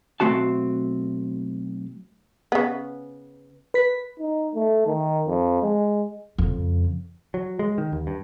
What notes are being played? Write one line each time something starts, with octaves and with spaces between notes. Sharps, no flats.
B1 B2 A3 C4 F#4 A5
C#3 B3
B4 B6
D#4
A3
D#3
F2
G#3
F2 C#3
F#3
G#3
D#3
D#2
G2